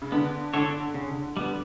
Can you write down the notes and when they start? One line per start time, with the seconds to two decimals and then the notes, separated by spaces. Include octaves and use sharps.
0.02 C#3
0.12 D3 B3
0.54 D3 D4 A4 C#5
0.94 C#3
1.37 G3 B3